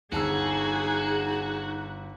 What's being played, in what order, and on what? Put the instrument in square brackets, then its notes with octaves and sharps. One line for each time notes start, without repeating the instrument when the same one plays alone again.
[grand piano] G1 A5 E6 [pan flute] D#4 [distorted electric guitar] F#4 [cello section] G#4